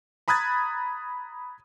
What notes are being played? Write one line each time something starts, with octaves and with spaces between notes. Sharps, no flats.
A#5 B5 D#6 F#6 G#6 A6